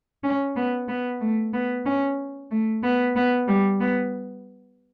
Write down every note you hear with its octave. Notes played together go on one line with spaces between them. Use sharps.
C#4
B3
B3
A3
B3
C#4
A3
B3
B3
G3
B3